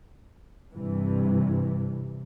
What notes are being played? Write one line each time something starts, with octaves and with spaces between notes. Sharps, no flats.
G2 C3 E3